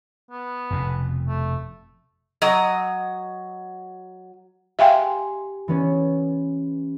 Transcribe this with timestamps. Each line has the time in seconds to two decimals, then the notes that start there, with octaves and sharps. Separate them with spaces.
0.31 B3
0.70 F1 F2 B2
1.28 A3
2.42 F#3 D#5
4.79 G4 E5 F5 G5 G#5 C6
5.68 E3 B3 C#4